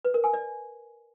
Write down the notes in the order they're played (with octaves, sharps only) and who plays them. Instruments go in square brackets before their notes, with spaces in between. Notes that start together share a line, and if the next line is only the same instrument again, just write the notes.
[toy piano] B4
A#4
G#5
D5